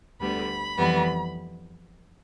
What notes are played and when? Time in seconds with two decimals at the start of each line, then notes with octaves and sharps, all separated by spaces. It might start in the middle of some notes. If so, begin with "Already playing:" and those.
0.21 D2 D3 G3 B3 B5
0.77 F2 E3 G3 B3